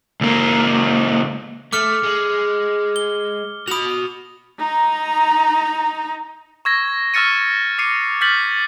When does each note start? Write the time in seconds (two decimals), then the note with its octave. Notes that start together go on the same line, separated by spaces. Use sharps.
0.21 C#2 A#3
1.73 A3 D6 F6 C#7
2.04 G#3
2.96 G7
3.68 F#4 B5 D#6 F7
4.59 D#4 A#5
6.65 C#6 E6 G#6 A#6
7.14 C#6 E6 F6 A6 C#7 D#7
7.78 D6 C7 C#7 D#7
8.21 F6 G6 A6 B6 F#7